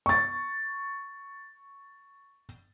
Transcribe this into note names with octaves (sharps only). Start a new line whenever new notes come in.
C#6 A6